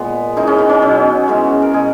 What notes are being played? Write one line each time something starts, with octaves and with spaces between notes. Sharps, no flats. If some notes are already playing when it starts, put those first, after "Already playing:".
Already playing: A#2 G#3 B3
C#3 E3 G#3 D#4
C#4
B3
C#4
B2 F#3
C#3 E3 G#3
A#4
B2 G#3 G#4